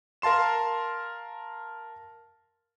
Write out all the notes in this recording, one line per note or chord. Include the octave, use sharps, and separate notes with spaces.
A#4 F5 A5 C6 E7